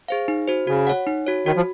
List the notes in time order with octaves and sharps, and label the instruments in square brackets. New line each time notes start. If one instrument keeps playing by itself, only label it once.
[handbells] G#4 C5 F5
D#4
F#4 C5
[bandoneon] C#3 [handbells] F#4
[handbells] C#5 F#5
D#4
F#4 C#5
[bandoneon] D#3 [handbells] F#4
[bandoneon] F3